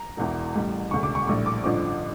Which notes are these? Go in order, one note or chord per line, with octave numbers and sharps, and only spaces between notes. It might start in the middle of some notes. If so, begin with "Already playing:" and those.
Already playing: A#5
E1 E2 E3
A1 A2 G3
E1 D2 C#3 C#6
D6
C#6
A#1 A2 G3 C#6
D6
A1 G2 D3 F3 D6